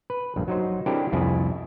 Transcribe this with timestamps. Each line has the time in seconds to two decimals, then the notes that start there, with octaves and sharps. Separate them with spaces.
0.10 B4
0.36 A#1 G2
0.48 F#3 D#4 C5
0.86 C4 D4 E4 G4 A4 A#4
1.12 C2 F2 E4 G#4 A5